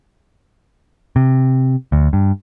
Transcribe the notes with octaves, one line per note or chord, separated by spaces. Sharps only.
C3
D2
G2